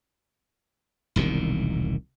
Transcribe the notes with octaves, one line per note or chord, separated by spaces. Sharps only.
E1 C2 A#2 D#3